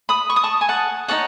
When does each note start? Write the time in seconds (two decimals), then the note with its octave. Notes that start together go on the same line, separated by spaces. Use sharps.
0.09 B5 D#6
0.30 C#6
0.36 D#6
0.44 A5 C#6
0.61 G#5
0.69 F#5 A5
1.08 D#4 F#4 C#5 F#5 A5